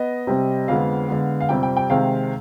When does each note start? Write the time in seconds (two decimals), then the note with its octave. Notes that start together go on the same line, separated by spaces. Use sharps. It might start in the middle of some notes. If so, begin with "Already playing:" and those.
Already playing: B3 D#5
0.27 C3 G3 C4
0.68 F2 D3 G#3 B3 F5
1.08 D3 G#3 B3
1.40 F5
1.49 F2 C3 G3 C4 G5
1.63 G5
1.77 G5
1.90 C3 D#3 G#3 C4 F5